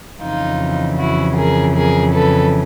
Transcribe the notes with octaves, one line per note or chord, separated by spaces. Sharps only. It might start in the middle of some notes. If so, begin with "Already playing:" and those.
F2 C#3 E3 D#4 F4
E4 F#4
G#4 A#4
G#4 A#4
A4 B4